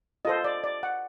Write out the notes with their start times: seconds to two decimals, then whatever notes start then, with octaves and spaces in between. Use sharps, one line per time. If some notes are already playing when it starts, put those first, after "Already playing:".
0.25 F4 A4 C5 D#5
0.44 D5
0.64 D5
0.83 F#5